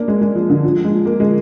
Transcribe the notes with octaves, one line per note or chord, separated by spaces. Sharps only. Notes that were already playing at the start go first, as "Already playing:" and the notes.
Already playing: A#3 D4
G#3
G#3
F3
D3
F3
G#3
A#3
G#3